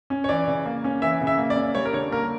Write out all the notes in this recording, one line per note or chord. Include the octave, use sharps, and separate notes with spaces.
C#4
C#5
E3 D5
C#3
A#3
C#4
E3 E5
C#3
E5
A#3
D5
C#4
G3 C#5
A#4
D3 C#5
A#3 A#4